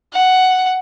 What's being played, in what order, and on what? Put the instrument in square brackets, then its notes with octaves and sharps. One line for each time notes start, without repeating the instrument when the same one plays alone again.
[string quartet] F#5